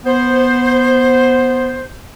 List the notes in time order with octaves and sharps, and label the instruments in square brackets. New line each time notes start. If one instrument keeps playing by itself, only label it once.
[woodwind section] B3 C5